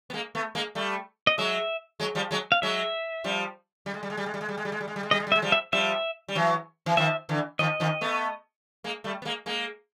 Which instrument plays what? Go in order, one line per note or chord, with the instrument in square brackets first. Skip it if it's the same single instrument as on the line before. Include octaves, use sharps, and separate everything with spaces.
[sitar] B3
G#3 A#3
A3 B3
G#3 A#3
G3 A3
[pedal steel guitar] D#5
[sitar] F#3 G#3 [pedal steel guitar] E5
[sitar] F#3 G#3
F3 G3
F#3 G#3
[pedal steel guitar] F5
[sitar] F#3 G#3 [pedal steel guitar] E5
[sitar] F3 G3
G3
G#3
G3
G#3
G3
G#3
G3
G#3
G3
G#3
G3
G#3
G3
G#3
G3
G#3
[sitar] G3 [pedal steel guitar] D#5
[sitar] G#3
G3
[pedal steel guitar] E5
[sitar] G#3
F3 G3
[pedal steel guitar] E5
[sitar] F3 G3 [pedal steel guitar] E5
[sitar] G3
E3 F#3
E3
[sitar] D#3 F3 [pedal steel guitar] E5
[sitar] D3 E3
[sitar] D#3 F3 [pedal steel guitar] D#5
[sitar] D#3 F3
A3 B3
G#3 A#3
G3 A3
B3
G#3 A#3
G#3 A#3